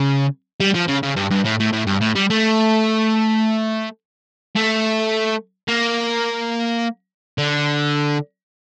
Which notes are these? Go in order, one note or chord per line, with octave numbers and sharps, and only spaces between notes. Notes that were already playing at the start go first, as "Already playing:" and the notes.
Already playing: C#3
G3
F3
C#3
C#3
G2
G2
A2
A2
A2
G2
A2
G3
A3
A3
A#3
D3